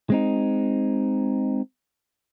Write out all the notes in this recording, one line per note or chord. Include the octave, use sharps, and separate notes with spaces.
G#3 C4 D#4